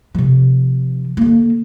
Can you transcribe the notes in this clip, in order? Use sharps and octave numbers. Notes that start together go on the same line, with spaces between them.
C3 F3
D3 A#3